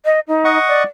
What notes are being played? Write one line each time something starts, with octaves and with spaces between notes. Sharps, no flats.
D#5
D#4
D#5 F#5 C#6
D5